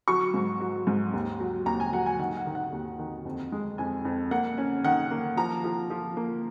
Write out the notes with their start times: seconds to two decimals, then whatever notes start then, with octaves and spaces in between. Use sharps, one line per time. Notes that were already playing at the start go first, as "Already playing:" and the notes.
0.08 F#3 C#6
0.34 G#2
0.60 F#3
0.87 G#2
1.13 D#2
1.40 F#3
1.66 D#2 A#5
1.80 G#5
1.93 F#3 F#5
2.06 G#5
2.19 D#3 F#5
2.37 F#5
2.46 D#3
2.55 F#5
2.72 D#2
2.99 D#3
3.25 F2
3.52 G#3
3.78 F2 G#5
4.05 F2
4.31 A#3 F#5
4.58 C#4
4.84 D#3 F#5
5.11 A#3
5.37 F3 A#5
5.64 F3
5.90 F3
6.17 A#3